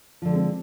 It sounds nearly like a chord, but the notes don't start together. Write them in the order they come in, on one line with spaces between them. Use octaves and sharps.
F3 D3 A3 G#3 C4